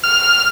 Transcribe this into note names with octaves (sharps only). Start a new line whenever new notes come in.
F6